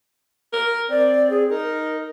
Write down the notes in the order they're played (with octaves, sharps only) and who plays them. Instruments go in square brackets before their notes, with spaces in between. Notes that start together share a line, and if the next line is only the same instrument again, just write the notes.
[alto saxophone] A#4
[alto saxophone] C4 [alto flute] D5
[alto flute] G#4
[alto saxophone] D#4 [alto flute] A#4